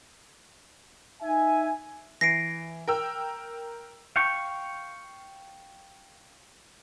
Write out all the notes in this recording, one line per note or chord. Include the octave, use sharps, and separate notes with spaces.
D#4 E5 G#5
E3 A#6 C7 D7
A#4 G5 E6
F5 G5 C#6